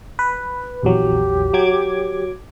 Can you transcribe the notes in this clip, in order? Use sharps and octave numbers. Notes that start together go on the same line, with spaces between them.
B4
A#1 E2 F#3 G4
F#3 D6 G#6